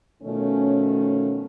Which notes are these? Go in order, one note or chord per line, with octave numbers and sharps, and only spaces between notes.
B2 D#3 F3 A3 C#4